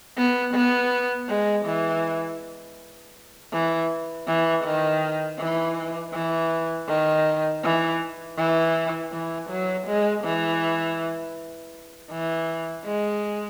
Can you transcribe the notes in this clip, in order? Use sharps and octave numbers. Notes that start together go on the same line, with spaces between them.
B3
B3
G#3
E3
E3
E3
D#3
E3
E3
D#3
E3
E3
E3
F#3
G#3
E3
E3
G#3